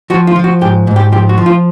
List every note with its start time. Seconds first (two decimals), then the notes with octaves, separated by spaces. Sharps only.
0.10 F3 F#4
0.27 F4
0.36 F3
0.44 F#4
0.61 G#2 G4
0.87 G#2
0.96 G4
1.12 F3 G4
1.29 F#4
1.38 F3
1.46 F4